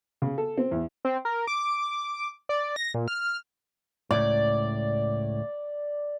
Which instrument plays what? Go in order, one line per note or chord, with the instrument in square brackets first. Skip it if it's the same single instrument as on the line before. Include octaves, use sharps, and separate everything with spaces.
[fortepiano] C#3
A4
C4
E2
[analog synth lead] C4
A#4
D6
D5
A#6
A#2
F6
[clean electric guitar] C#2 F#2 A2 [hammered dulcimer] D5